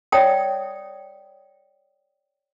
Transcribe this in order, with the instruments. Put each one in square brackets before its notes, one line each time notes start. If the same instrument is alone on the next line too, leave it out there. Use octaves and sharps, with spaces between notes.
[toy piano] C#5 D5 E5 G5 D#6